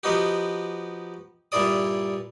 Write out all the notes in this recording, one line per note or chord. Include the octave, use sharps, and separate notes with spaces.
F3 B3 D#4 F#4 G4
G2 A#2 E4 G#4 D5 D#6